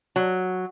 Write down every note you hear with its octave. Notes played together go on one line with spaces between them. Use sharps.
F#3